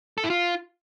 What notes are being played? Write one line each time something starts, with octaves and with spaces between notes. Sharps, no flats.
A4
E4
F4